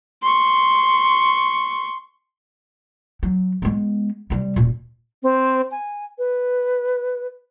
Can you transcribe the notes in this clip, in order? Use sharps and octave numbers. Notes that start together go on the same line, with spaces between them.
C6 C#6
F#3
G#3 B3
C3 G3
D#1 A#2
C4
G#5
B4